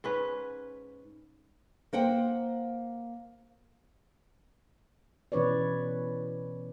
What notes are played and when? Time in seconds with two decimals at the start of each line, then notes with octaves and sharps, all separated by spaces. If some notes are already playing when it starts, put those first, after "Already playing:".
0.04 G#2 C#4 B4
1.93 A#3 C5 F#5 G5
5.32 B2 E3 C#4 B4 C#5 D5